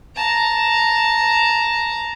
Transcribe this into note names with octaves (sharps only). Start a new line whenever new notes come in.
A5 A#5